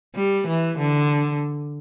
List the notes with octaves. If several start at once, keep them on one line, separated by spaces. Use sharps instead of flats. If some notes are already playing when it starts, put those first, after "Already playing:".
G3
E3
D3